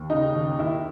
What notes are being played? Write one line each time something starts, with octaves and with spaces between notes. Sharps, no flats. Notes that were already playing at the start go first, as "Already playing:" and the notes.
Already playing: D#2
C#3 D#4
D#2
D#3 E4